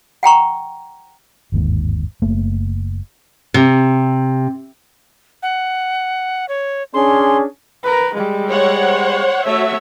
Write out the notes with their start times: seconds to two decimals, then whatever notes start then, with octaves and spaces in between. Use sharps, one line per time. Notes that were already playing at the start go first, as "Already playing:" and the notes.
0.23 F#5 G5 A#5 C#6
1.52 G1 D#2 G#2
2.22 F#1 A3 A#3
3.54 C3
5.43 F#5
6.49 C#5
6.94 C#4 D4 G#4 C6
7.83 A#4 B4
8.14 G3 G#3
8.50 C5 C#5 F#5
9.46 A3 F#4 C#5 E5